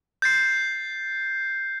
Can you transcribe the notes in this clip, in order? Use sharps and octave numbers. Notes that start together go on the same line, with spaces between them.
G6 A6 C7